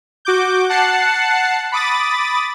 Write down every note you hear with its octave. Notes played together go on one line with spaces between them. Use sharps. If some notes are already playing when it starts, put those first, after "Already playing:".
F#4 D6 G6
F#5 A5 F#6 C7 C#7
B5 D6 D#6 A6